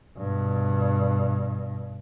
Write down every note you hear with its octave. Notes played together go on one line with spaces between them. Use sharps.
G2 B2